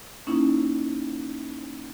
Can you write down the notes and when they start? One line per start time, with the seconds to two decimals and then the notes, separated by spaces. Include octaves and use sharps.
0.27 A#3 C#4 D#4 E4